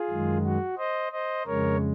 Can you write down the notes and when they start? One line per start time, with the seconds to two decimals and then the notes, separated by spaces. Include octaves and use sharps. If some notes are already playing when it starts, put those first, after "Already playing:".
Already playing: F4 G#4
0.10 F#2 D#3 G#3
0.44 F#4
0.78 C5 D#5
1.12 C5 D#5
1.46 F2 C#3 G#3 A#4 C#5